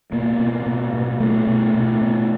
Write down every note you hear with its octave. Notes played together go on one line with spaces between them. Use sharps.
B2 A#3
B2
B2
B2
B2 A3
B2
B2
B2